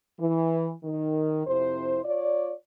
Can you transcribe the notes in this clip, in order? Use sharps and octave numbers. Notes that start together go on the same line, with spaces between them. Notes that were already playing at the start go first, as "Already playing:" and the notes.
E3
D#3
F2 C3 E4 C5
F4 C#5 D5